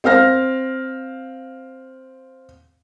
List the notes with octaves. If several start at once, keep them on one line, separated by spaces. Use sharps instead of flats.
C4 F5 F6 A#6